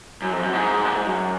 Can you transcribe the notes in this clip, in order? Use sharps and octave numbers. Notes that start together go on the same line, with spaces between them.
F#2
F2
F#2
G#2
A#2
G#2
F#2